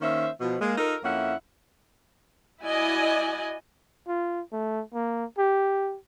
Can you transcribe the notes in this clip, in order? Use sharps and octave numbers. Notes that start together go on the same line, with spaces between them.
D#3 A#3 C#4 C5 E5
B2 F3
G#3 A#3
D#4 F4 A4 A#4
F2 A#3 C#4 E4 E5 F#5
E4 F#4 D5 D#5 G#5
F4
A3
A#3
G4